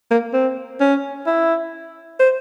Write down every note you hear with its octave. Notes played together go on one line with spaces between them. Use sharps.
A#3
C4
C#4
E4
C5